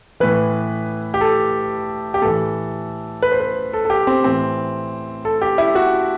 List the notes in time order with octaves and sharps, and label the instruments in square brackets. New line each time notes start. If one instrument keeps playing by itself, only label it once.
[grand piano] A2 E3 B4
G4
A4
G4
A2 E3 A4
B4
C5
B4
A4
A4
G4
C4
A2 E3 C4
A4
G4
E4
F#4